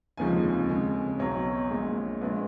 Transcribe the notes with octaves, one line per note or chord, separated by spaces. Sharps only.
F1 D#2 C#3 F3 G#3 G#5
F2 C#3 G#3
B1 B2 F#3 C#5
A#1 A#2 G#3
A#1 A#2 G#3 B4